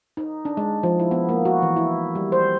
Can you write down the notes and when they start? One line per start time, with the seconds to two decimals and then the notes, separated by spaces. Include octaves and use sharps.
0.17 D#4
0.45 D4
0.57 G#3
0.83 F3
0.99 E4
1.11 B3
1.29 A#3
1.45 F#4
1.62 E3
1.76 E4
2.15 G3
2.32 C5